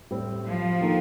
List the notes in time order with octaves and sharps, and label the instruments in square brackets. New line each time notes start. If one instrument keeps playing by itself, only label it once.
[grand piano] A2 G3 C4
[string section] F3
[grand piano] D#3 A#3 D#4 A4